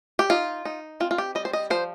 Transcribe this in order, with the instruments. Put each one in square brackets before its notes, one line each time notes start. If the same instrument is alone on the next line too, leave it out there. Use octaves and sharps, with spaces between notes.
[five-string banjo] G4
D#4 F4
D#4
C4 F4
F4
G4
G3 D#5
C5
D#5
F3 C5